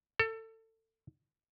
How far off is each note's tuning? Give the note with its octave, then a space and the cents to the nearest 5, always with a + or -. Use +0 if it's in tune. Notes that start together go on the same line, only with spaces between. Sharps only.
A4 +25